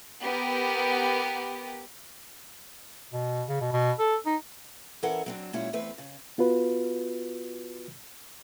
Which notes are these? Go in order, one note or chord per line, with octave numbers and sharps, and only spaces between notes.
B3 G4 A#4 G5
B2
C#3
B2
B2
A4
D#4
E3 C#4 A4 A#4 F#5
F#3 C4 D4
A#2 F#3 G#3 C#4 E4 C#5
E2 A3 C4 B4
C#3
B3 F4 F#4 B4